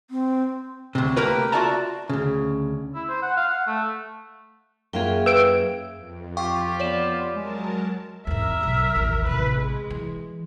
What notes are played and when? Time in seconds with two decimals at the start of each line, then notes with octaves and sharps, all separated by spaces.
0.10 C4
0.95 D2 C3
1.17 A3 A#3 G4 A#4 B4
1.52 F4 F#4 D5 E5 A5 A#5
2.10 D2 C#3
2.95 E4
3.09 C5
3.23 F#5
3.37 F5
3.50 F#5
3.67 A3
4.93 F#2 A#3 F4 G#4 E5 G5
5.26 B4 E6 D7
5.96 F2
6.37 F4 G4 F5 G5 C#6
6.80 B3 C#5 D5 E7
7.35 F#3 G#3 A#4 A5
8.27 G#1 E2 A#4 E5
8.63 B1 G#2
8.95 A1 D#2
9.26 A1 C3 B4
9.57 G#3
9.90 E3